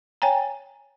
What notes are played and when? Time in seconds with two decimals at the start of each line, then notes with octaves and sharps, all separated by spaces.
0.22 C#5 G5 G#5 A#5